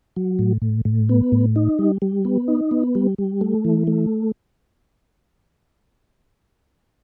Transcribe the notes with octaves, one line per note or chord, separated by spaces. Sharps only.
F#3
A2
A2
A2
B3
A2
D#4
G3
G3
B3
D#4
B3
G3
G3
A3
E3
A3